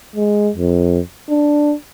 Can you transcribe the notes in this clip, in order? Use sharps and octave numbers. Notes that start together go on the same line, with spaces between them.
G#3
F2
D4